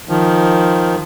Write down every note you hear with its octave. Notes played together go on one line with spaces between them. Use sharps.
D#3 F3